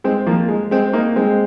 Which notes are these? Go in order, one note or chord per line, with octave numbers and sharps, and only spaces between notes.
G#3 C4
F3 A#3
G#3
G#3 C4
A#3 D#4
G#3 C4